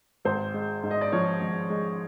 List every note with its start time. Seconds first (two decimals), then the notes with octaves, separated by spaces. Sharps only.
0.25 G#1 C5
0.54 G#3
0.83 G#2
0.91 D#5
1.01 D5
1.12 F3 C#5
1.41 G#1
1.70 G#3